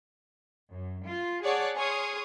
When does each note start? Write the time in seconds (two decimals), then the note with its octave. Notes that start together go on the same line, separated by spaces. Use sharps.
0.70 F#2
1.06 F4
1.43 G#4 C#5 D5 F#5 A5 F#6
1.75 G#4 C#5 C6 C#6 D#6 F6